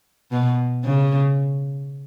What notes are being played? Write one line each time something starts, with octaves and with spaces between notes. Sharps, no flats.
B2
C#3